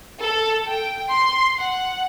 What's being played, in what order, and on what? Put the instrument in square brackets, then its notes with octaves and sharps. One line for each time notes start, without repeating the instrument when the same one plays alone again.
[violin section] A4
G5
C6
F#5